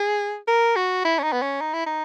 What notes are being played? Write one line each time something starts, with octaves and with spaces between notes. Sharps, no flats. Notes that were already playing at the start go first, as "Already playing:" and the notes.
Already playing: G#4
A#4
F#4
E4
C#4
D#4
B3
C#4
D#4
E4
D#4